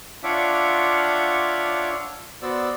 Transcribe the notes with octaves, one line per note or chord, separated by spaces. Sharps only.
D4 F4 C#5 E5 F#5 D6
B3 F#4 C5 D5 E6